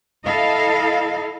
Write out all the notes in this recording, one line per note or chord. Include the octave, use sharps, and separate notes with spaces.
E4 A4 D#5 F5